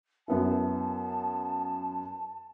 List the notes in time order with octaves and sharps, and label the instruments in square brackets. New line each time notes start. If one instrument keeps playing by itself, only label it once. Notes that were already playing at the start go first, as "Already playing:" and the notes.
[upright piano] F#2 B3 E4 [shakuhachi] A5